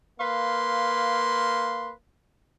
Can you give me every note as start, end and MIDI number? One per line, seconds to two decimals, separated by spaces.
0.20 1.92 58
0.20 1.92 71
0.20 1.92 77
0.20 1.92 84